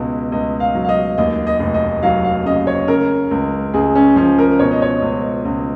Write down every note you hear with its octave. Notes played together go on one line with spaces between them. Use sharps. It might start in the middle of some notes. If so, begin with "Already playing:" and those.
Already playing: C#2 B2
C#2 D#5
F5
F#3
F5
D#5
D#2 D#5
D#5
F1
D#5
F#3 F5
F5
C#3 D#5
C#5
C#3 A#4
C#2
C#2 G#4
C#4
F3 C#4
A#4
B2 C#5
D#5
C#5
C#2
C#2